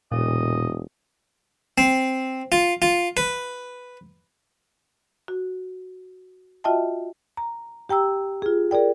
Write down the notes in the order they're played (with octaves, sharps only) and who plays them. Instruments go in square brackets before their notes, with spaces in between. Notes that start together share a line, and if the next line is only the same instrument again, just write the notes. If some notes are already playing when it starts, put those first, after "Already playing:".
[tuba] E1 [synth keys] A#2 [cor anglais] D#5
[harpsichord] C4
F4
F4
B4
[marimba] F#4
F4 F#4 D#5 E5 G5 A5
A#5
G4 G5 A#5 E6
F4 G#4
G#4 A#4 D5 G5